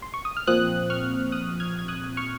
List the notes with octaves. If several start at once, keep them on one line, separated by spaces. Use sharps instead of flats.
C6
C#6
D#6
F6
A#2 F3 C4 D#6 F#6
C#6 F6
D#6 F#6
F6 G#6
G#6
D#6 F#6
C#6 F6